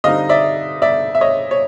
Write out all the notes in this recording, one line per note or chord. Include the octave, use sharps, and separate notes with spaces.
D3 G3 C4 D#4 D#5 F5
D5 E5
D5 E5
E5
C#5 D#5
C#5